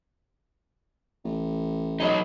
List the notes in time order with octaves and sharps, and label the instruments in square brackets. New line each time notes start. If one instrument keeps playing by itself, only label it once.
[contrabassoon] A1
[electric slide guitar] F#3 D#4 [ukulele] G#4 B4 D#5